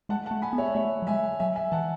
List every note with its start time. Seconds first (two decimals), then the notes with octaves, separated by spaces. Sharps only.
0.09 G#3 F#5 A5
0.26 F#5 A5
0.31 A3
0.42 G#5 B5
0.53 B3
0.58 C#5 E5
0.74 A3 C#5 E5
1.02 F#3
1.07 G#3 E5 G#5
1.40 F#3 E5 G#5
1.56 E5 G#5
1.72 E3 F#5 A5